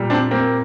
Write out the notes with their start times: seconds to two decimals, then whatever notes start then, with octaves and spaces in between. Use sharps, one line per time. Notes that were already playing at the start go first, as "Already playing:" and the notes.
Already playing: A#2 G3
0.10 C4 D4
0.31 A#3 C4